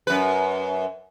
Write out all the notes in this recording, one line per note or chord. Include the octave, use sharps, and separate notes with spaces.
F#2 B4